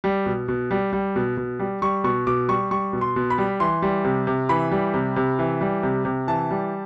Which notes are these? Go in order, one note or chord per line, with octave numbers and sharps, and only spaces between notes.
G3
B2
B2
G3
G3
B2
B2
G3
G3 C#6
B2 C#6
B2 D6
G3 C#6
G3 C#6
B2
C6
B2
B5
G3
E3 C6
G3
C3
C3
E3 B5
G3
C3
C3
E3
G3
C3
C3
E3 A5
G3